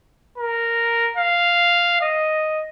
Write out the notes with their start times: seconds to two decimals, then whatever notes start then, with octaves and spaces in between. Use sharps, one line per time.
0.38 A#4
1.17 F5
2.01 D#5